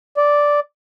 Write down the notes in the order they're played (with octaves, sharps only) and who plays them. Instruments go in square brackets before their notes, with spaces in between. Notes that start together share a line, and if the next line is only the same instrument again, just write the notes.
[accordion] D5